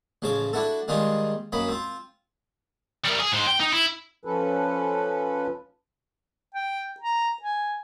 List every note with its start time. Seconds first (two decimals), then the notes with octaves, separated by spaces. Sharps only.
0.22 A1 C#3 F3 C#5 D6
0.53 D4 E4 F#4 A4
0.88 D#3 G3 G#3 D#4 F4 G4
1.52 F#2 F#3 A#3 D#5 B5
1.68 C4 F4
3.05 G3 A#4
3.20 G#4
3.32 G#2 C5
3.47 G5
3.60 D#4
3.73 E4
4.25 F3 C#4 A4 B4
6.55 G5
7.00 A#5
7.43 G#5